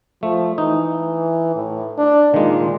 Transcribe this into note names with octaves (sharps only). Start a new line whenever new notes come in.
F3 A3
E3 D#4
A2
D4
A#2 D#3 G#3